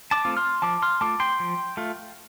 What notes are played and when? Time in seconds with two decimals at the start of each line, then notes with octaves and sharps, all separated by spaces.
0.11 A5 D6
0.25 A3 C4 F4
0.37 C6 F6
0.62 F3 A5 D6
0.82 C6 F6
1.01 A3 F4 A5 D6
1.20 G5 C6
1.40 F3
1.77 A3 F4